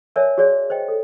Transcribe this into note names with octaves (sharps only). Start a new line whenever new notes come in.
A#4 C#5 D5 E5 G#5 A5
F#4 G#4 C#5 D5
C5 D#5 G5
A4